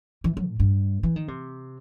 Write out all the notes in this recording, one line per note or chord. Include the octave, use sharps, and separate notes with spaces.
E3
F#3
A2
G2
E3
D#3
C3